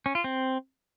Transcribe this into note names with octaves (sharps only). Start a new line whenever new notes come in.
C#4
F4
C4